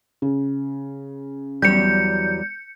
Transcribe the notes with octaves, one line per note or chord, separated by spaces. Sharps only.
C#3
E2 F#3 G3 G6 C#7